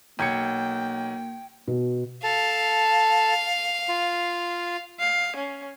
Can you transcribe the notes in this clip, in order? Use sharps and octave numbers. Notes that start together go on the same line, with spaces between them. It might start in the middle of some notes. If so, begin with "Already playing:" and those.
B1 A#3 G5 G#6 C#7
B2
A4 F5 A5
F4
F5
C#4